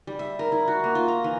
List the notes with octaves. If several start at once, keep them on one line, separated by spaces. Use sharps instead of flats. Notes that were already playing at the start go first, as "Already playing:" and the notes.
G3
E5
A#4
E4
F#4
A#3
F4
A#5
E3